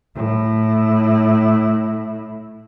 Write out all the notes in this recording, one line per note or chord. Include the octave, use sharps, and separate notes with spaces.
A2 E4